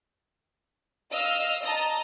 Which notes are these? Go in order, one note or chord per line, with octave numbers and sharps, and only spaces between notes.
D#5 F5 E6 F6
D#5 A5 A#5